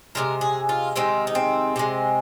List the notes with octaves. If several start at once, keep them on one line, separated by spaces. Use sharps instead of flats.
C3 F3 G#3 A#4
G#4
F4
C3 D#3 G#3 C4
D#4
C4
C3 D#3 G#3